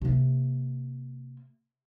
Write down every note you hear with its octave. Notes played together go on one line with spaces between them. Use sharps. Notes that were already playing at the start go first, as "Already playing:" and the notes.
C3 A#3